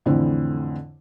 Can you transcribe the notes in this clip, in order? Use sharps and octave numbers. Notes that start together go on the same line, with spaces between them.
F2 A2 D3 E3 C4 E4